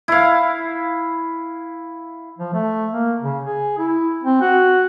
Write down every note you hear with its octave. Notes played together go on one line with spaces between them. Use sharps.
E4 F5
F3
A3
A#3
C#3
G#4
E4
C4
F#4